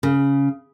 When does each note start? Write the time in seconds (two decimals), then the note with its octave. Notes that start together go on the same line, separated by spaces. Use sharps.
0.03 C#3